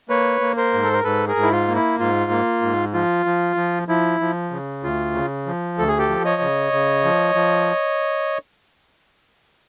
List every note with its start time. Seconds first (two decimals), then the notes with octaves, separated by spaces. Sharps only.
0.09 A#3 B4 C#5
0.41 A#3
0.57 A#4 C5
0.73 G#2
0.84 A4
0.93 A#4
1.04 G#2 A4 B4
1.28 G#4 A#4
1.36 G#2
1.43 E4
1.52 F4
1.68 A#3
1.75 E4
2.00 G#2 F4
2.31 A#3
2.62 G#2
2.93 F3 F4
3.26 F3
3.56 F3
3.88 F3 E4
4.20 F3
4.51 C#3
4.83 D2 F4
5.14 C#3
5.46 F3
5.78 D2 A4
5.88 G#4
5.98 G4 A4
6.09 F3
6.25 C#5 D#5
6.41 C#3
6.73 C#3
7.05 F3
7.35 F3